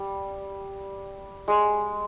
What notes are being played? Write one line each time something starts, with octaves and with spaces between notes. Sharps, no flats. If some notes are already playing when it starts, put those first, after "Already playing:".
Already playing: G3
G#3